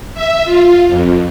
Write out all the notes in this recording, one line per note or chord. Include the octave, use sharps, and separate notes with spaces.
E5
F4
F2